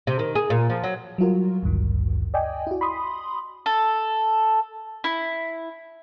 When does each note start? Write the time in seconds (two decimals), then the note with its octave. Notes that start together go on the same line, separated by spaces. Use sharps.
0.07 C3
0.19 D#3
0.35 G#4
0.50 A#2
0.70 F3
0.84 F#3
1.18 F#3 G3 F4 F#4 A#4
1.63 A1 D2 G2 D#3
2.34 D5 D#5 G5 G#5
2.67 E4 F#4
2.81 B5 C6 D#6
3.66 A4
5.04 E4